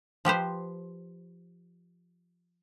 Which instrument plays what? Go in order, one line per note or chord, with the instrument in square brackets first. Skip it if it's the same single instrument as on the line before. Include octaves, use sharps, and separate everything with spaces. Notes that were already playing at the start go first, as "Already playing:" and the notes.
[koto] F3 G4 B4 C5